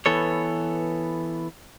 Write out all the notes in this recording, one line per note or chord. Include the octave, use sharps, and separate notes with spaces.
E3 B3 A4 C#5